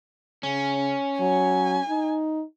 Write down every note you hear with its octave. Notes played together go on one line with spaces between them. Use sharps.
C#3 C#4
F#3 G#5
D#4